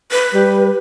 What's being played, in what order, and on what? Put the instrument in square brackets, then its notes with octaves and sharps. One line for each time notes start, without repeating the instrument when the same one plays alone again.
[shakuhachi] B4
[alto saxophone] G3